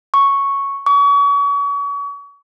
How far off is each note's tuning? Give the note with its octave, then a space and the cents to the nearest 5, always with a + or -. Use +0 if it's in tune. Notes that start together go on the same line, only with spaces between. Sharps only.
C#6 +0
C#6 +35